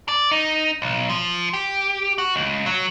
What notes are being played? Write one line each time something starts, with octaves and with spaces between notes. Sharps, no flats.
D5
D#4
B1
F3
G4
F#4
C#2
F#3